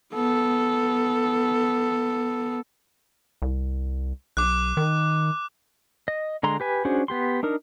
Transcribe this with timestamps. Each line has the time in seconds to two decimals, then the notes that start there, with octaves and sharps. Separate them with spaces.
0.13 B3 A4
3.42 C2
4.37 B1 D6 F#6
4.77 D#3
6.08 D#5
6.43 D3 G#3 A#5 C6
6.60 G4 B4 G#5
6.85 C#4 D4 F#4 G#4 C5
7.08 B3 G4 C6
7.43 D4 D#4 A#4